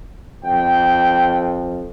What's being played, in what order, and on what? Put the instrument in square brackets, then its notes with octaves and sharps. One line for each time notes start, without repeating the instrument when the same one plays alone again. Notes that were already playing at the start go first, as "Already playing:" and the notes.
[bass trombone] F2 [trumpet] G5